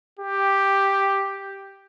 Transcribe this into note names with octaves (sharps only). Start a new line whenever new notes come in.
G4